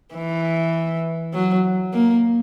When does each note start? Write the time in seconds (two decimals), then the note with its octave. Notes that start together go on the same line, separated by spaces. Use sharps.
0.15 E3
1.34 F#3
1.93 A#3